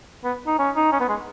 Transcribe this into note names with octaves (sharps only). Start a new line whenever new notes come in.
B3
D#4
C#4
D#4
C#4
B3
G#3